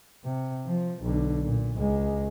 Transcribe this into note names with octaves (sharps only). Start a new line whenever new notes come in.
C3
F3
B1 D3
A#2
C#2 G#3